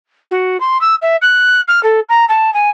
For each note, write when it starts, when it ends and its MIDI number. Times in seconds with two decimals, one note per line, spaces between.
0.31 0.60 66
0.60 0.80 84
0.81 0.95 88
1.02 1.16 76
1.22 1.61 90
1.68 1.83 89
1.83 2.00 69
2.09 2.25 82
2.29 2.53 81
2.54 2.70 80